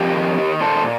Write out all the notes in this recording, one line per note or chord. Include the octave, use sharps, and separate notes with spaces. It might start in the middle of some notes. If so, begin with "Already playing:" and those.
Already playing: F2 G4 A#4
D#3
D#3
A#2 A4 C5
A#2